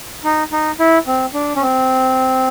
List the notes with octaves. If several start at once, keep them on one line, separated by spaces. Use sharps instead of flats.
D#4
D#4
E4
C4
D4
C#4
C4